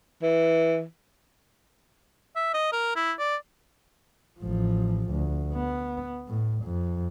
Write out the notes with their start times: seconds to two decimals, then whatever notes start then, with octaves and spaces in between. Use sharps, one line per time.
0.23 E3
2.36 E5
2.54 D#5
2.72 A#4
2.96 E4
3.19 D5
4.40 A1 F3
5.10 D2
5.55 B3
6.28 A2
6.64 F2